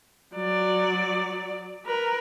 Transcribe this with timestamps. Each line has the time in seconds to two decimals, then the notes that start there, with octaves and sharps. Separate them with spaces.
0.36 F#3 D5
1.86 A#4 B4